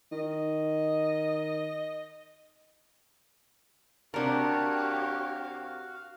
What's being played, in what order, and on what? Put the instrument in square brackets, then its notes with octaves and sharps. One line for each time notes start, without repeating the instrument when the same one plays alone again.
[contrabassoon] D#3 [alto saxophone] D#5
[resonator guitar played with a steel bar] C3 A#4 [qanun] D4 A4 [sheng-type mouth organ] F#4 F5 [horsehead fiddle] G4 C#5